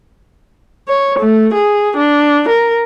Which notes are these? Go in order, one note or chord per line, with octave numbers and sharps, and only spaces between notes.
C#5
A3
G#4
D4
A#4